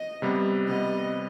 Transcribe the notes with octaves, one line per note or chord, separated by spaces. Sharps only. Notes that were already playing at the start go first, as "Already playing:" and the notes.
Already playing: D#5
C3 G3 B3
C3 G3 B3 D#5